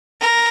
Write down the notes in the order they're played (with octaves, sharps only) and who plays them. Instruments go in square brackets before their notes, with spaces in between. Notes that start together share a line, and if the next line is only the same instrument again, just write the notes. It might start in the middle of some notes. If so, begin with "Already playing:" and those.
[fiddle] A#4